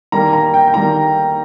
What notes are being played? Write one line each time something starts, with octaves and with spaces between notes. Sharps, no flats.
D#3 G3 A#3 A#5
A#5
G5
G5
D#3 G3 A#3 A#5